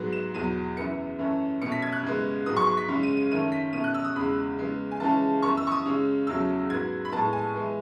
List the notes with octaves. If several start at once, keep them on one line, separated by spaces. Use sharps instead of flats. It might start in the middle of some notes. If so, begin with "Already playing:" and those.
Already playing: G#2 F#3 B3
E7
E2 B2 F#3 D#7
F#2 E3 B3 C#7
F#2 E3 A3 C#4
B2 A3 C#4 C#7
B6
G#6
F#6
F#2 C#3 G#3 B3
G#2 F#3 B3 D#6
C#6
C#6
B6
F#2 C#3 G#3 C#4
D#7
D#7
F#2 D#3 A3 C#4 D#7
B6
B2 A3 C#4 D#7
F#6
E6
D#6
E2 C#3 G#3 B5
C#3 G#3 B3
G#5
C#3 E3 G#3 C#4 A5
F#2 E3 B3 C#6
E6
C#6
D#6
C#3 G#3 C#4
E2 C#3 F#3 A3 C#4 E6
G#2 F#3 B3 G#6
B5
A2 G#3 B3 A5
G#5
E3 G#3 B3